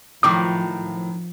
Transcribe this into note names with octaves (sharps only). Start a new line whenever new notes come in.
A2 D#3 F3 F#3 D6